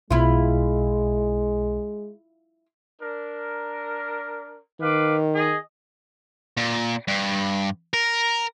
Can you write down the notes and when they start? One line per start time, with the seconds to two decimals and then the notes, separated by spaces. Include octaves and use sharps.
0.11 B1 B2 G#3 E4 F4
3.02 D4 A#4
4.80 D#3 B4 F5 D6
5.35 G#4 D#5 D#6
6.57 A#2
7.08 G2
7.94 A#4